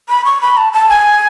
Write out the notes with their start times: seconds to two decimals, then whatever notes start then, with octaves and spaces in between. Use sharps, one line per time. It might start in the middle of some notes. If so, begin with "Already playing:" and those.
0.09 B5
0.25 C#6
0.41 B5
0.57 A5
0.73 A5
0.89 G#5